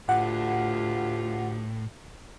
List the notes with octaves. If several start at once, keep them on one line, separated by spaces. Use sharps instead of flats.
D2 A2 F4 G4 F#5